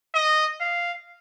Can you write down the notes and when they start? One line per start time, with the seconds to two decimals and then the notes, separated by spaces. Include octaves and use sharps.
0.14 D#5
0.60 F5